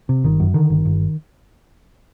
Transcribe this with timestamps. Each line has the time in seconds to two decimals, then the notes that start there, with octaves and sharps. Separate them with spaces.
0.09 C3
0.24 G1 D#3
0.40 F#2
0.54 D3 D#3
0.70 G1
0.85 G1